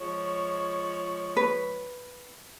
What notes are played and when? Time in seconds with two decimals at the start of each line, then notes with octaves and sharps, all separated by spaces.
0.01 F3 G#3 C#5
1.37 B4